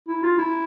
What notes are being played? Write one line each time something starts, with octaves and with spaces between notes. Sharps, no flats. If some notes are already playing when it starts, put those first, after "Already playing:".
E4
F4
E4